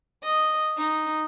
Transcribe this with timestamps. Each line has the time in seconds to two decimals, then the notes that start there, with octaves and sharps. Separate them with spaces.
0.23 D#5
0.78 D#4